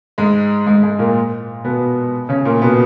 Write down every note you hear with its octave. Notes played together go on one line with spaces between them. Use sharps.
G#2 G#3
G#2 G#3
G#2 G#3
A#2 A#3
B2 B3
C#3 C#4
A#2 A#3
B2 B3